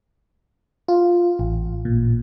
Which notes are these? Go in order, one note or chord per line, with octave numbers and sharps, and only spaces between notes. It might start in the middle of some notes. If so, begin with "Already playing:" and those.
F4
A1
A#2